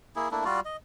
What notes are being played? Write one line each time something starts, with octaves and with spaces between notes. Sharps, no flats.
A#3 E4 G#4
A3 A#3 D4 E4
G3 F4 F#4 D5
D#5